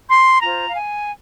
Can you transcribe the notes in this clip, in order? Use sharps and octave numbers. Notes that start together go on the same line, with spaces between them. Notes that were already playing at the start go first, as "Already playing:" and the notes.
C6
F4 C5 A#5
F5
G#5